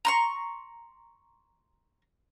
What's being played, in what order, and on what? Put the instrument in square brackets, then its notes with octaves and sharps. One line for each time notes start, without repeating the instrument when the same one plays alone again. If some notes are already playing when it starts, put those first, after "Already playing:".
[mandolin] A#5 C6 C#6